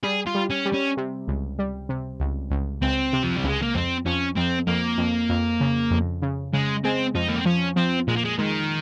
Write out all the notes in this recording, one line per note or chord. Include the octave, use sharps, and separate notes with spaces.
G3 G#4
F4
G3
C#4
G3
C#4
C3
C#2
G3
C3
C#2
C#2
C#2 C4
C3
F3
G3
C#2 G#3
A#3
F2 C4
F2 C#4
F2 C4
F2 A#3
F2
F2
C#3
F2
C#3
C#3 G#3
G#3 C4
F2 D#4
A#3
C4
F3 C#4
F3 C4
A#2 G#3
A#3
G#3
D#3 G#3